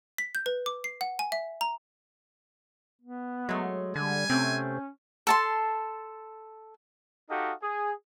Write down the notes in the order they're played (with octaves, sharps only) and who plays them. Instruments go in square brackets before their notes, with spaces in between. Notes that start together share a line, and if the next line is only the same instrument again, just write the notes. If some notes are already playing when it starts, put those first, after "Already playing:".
[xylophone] B6
G6
B4
D6
C7
F#5
G#5
E5
A#5
[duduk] B3
[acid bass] F#3 [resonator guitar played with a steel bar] G#3 A3
[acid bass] D3 [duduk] G3 [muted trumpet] G#5
[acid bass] C3 [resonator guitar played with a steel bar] A3 C4 [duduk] C#4
[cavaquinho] A4 A5 C6
[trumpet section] D#4 F#4 G4 A4 D#5 F5
G#4